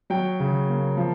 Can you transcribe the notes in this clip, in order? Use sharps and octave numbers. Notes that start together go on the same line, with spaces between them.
F#3 G5
C#3
A#3
F3